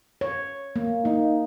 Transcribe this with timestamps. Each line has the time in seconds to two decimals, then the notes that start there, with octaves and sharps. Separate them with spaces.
0.21 C#5
0.76 A#3
1.05 A#3 D#4